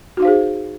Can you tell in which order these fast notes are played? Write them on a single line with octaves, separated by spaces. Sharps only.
F#4 D#4 F5 C5 G#4